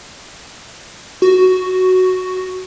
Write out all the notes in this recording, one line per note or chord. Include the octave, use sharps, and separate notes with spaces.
F#4